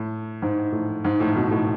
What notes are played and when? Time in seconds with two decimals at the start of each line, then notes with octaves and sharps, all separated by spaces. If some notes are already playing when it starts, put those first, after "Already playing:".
Already playing: A2
0.42 G#2
0.72 A2
1.05 G#2
1.20 A2
1.35 G#2 B2
1.51 A2